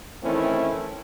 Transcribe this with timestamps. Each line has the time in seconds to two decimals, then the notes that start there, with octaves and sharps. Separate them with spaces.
0.24 D#3 E3 A3 C4 C#4 E4